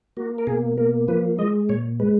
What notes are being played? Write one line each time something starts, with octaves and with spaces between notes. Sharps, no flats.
A#3 F#4
A#4
B2 G#4
A#3 A#4
F3 B4
G#3 D#5
A#2 C#5
G#3 B4